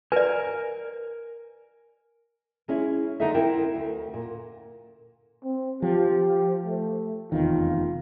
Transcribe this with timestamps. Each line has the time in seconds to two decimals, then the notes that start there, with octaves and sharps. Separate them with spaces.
0.12 A#4 B4 D5 G#5
2.68 G#3 C#4 E4
3.20 D3 G#3 D#4 A4 D#5 E5
3.34 C4 E4 A#4
3.75 D2
4.14 A#2
5.44 C4
5.82 F3 G4
6.65 A3
7.32 F1 E2 D#3 F4